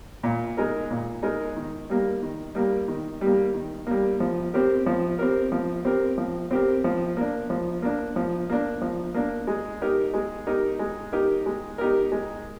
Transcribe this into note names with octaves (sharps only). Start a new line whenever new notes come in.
A#2
G#3 D#4 A#4
A#2
G#3 D#4 A#4
D#3
G3 A#3
D#3
G3 A#3
D#3
G3 A#3
D#3
G3 A#3
F3
C4 G4 A#4
F3
C4 G4 A#4
F3
C4 G4 A#4
F3
C4 G4 A#4
F3
A#3 D4
F3
A#3 D4
F3
A#3 D4
F3
A#3 D4
G#3
D#4 G4 A#4
G#3
D#4 G4 A#4
G#3
D#4 G4 A#4
G#3
D#4 G4 A#4
G#3